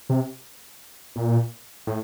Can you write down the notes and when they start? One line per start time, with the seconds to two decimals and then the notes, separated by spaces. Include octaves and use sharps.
0.10 C3
1.16 A#2
1.87 A2